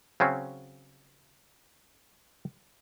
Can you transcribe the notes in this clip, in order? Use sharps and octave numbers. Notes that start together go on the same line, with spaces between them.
C#3 F#3 C4 C#4